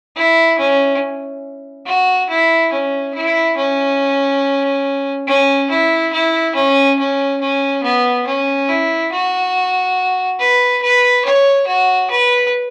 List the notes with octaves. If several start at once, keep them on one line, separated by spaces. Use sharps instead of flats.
E4
C#4
F#4
E4
C#4
E4
C#4
C#4
E4
E4
C#4
C#4
C#4
B3
C#4
E4
F#4
B4
B4
C#5
F#4
B4